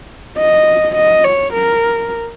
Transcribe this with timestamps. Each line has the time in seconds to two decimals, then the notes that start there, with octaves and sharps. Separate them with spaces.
0.38 D#5
0.96 D#5
1.24 C#5
1.53 A#4